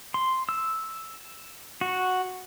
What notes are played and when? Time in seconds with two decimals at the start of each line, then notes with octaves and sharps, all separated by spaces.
0.14 C6
0.49 E6
1.81 F#4